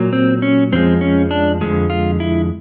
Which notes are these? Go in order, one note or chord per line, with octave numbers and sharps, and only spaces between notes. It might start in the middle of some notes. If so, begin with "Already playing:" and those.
Already playing: A#2 F#3 A#3
C4
C#4
F2 D3 F3 G#3 C4
C#4
D4
F2 D3 F3 G#3
F4
E4